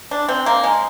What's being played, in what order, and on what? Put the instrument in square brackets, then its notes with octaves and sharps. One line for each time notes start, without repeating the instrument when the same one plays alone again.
[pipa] D4
C4
A#3
G#3